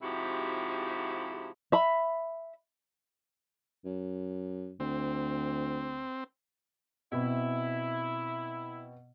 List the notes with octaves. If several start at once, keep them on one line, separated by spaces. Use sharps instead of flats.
G#2 C3 F3 E4 F#4 G4
E5 B5
F#2
D2 C4
B2 C4 E4